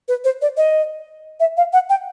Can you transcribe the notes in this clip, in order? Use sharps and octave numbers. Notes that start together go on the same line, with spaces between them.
B4
C5
D5
D#5
E5
F5
F#5
G5